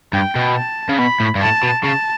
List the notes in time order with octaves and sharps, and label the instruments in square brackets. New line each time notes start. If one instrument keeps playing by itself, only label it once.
[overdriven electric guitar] G2 [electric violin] G5
[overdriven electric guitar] B2
[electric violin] A5
[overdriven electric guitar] C#3
[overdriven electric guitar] B2 [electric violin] B5
[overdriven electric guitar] A2
G2
[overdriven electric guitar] A2 [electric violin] A5
[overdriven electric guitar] B2
[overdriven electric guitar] C#3 [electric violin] A5